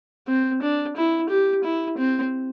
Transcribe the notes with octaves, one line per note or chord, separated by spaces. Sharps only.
C4
D4
E4
G4
E4
C4